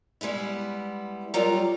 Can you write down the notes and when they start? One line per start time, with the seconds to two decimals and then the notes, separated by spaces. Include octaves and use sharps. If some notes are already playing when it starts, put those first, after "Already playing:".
0.21 G3 G#3 B3 E4
1.34 F#3 G3 F4 A#4 D5